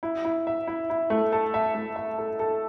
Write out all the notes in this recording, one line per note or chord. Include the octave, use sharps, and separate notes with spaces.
E4
E4
E5
E4
E4
A3
A4
E5
A3
E5
A4
A4